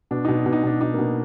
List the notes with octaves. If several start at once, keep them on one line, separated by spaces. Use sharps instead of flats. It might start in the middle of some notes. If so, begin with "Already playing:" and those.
B2 D4
B2 D#4
D4
B2
D#4
B2 D4
B2 D#4
B2 A#3 D4